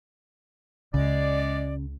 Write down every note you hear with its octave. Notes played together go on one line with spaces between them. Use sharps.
C#2 C#3 G#3 D5